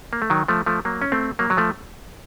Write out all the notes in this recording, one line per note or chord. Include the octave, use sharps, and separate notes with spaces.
A#3
A3
D#3 F#3
F3 A3
F3 A3
F#3 A#3
C#4
A3 C4
F#3 A#3
F#3
F3 A3